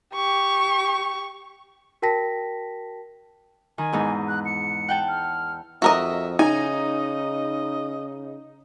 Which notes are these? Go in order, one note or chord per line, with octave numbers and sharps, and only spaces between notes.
G4 C#6
F#4 A#4 G5 A5 A#6 B6
D#3 G#5
E2 G#2 D#4
F#6
C#7
F#5 G5 A5
F6
F2 F#4 A#4 D#5 E5
C#3 D#4 D#5 G#5